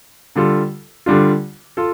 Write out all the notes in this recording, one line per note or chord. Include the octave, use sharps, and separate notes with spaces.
D3 G3 F4 A4
D3 G3 D4 F4
F4 A4